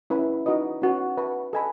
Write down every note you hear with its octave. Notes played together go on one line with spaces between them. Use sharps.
C#4 E4 B4 E5 B5
D#4 F#4 B4 D#5
C#4 F#4 B4
B4 E5 A5 C#6
A4 D#5 G#5 B5